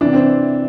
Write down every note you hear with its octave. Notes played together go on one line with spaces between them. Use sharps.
C3 E3 D4
C4